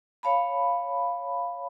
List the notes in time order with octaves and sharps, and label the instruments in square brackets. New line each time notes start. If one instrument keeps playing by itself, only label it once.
[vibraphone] C#5 F5 A5 B5